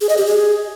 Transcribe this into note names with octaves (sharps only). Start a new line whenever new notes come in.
G#4
D#5
G4
G#4